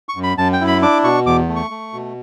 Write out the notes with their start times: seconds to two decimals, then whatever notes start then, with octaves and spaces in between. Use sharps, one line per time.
0.09 C#6
0.16 F#2
0.23 B5
0.37 F#2 A5
0.53 G5
0.61 E4
0.67 B5
0.82 D4 D6
1.04 B2 C#6
1.26 E2 D6
1.48 A3
1.56 C#6
1.70 A3
1.93 B2